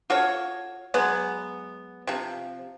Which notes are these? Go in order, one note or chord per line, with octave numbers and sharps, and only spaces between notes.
F4 F#4 A4 C#5
F#3 G#3 B3
C3 F3